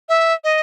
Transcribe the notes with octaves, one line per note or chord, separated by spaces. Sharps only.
E5
D#5